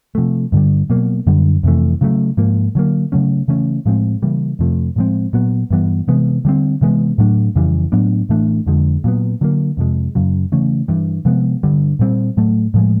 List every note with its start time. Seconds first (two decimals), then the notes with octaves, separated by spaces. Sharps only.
0.15 C3 F3 A3
0.52 G2 D3 G3
0.90 B2 F#3 A#3
1.27 F#2 D3 G3
1.63 F2 C3 E3 A3
2.01 C#3 F#3 A3
2.37 G#2 F3 A#3
2.75 D3 F#3 A#3
3.12 C#3 F#3 A3 C#4
3.48 C#3 E3 A3 C#4
3.86 A2 F3 G#3 C4
4.23 C#3 E3 G3 A#3
4.59 F2 C3 F3 A3
4.96 A2 F3 G#3 C4
5.33 A#2 F#3 B3
5.70 G2 E3 G3 B3
6.08 C3 E3 G#3 B3
6.45 D3 G3 C4
6.81 C3 E3 G#3 B3
7.18 A2 F#3 A3 D4
7.55 F2 C#3 E3 G3
7.92 A2 F#3 B3 D4
8.29 A2 E3 A3 D4
8.66 F2 D3 F3 G#3
9.04 A#2 F#3 B3
9.41 D3 F#3 A#3
9.77 F2 C3 F3 G#3
10.15 F#2 C#3 F#3
10.52 C#3 E3 A3 C#4
10.88 G2 E3 G3
11.25 C3 F3 G#3 B3
11.63 G2 D3 G3
11.99 A#2 G3 C4
12.37 A2 F#3 A3
12.74 A2 F3 G#3